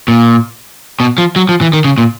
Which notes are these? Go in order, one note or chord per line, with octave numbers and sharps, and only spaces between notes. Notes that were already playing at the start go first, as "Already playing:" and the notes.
A#2
B2
F3
F#3
F3
E3
D#3
C#3
A#2